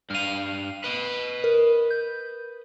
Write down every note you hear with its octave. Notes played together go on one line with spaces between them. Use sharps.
G2 F5 F6 D#7
B4 D#5
A#4
G6